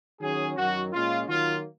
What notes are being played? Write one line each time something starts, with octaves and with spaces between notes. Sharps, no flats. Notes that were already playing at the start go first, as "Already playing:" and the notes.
D#3 F#3 C#4 G#4
F#2 D#3 F#3 F#4
A#2 G#3 C#4 F4
D#3 F#3 A#3 F4